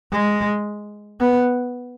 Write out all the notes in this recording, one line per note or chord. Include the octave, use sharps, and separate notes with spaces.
G#3
B3